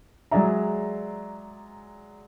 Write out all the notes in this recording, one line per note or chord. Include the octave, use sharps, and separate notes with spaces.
F#3 G#3 G#4 D5 E5 A#5